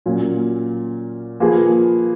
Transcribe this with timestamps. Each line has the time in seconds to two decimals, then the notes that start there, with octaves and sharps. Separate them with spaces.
0.06 A#2 F#3 C#4 F4
1.40 F3 A#3 F4 G#4 B4